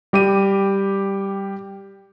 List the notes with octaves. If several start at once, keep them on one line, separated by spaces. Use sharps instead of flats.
G3 G4 D6 D#7